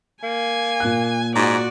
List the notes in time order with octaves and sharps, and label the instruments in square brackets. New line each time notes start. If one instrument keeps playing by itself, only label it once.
[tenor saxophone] A#3 [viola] G#5
[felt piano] A#2 F#6
[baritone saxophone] G#2 [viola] F#4 D5